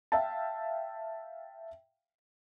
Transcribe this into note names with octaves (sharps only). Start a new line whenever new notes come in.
E5 F5 G5 A5